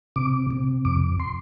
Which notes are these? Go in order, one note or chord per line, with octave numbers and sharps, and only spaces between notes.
C3 D6
C3
F2 D6
C6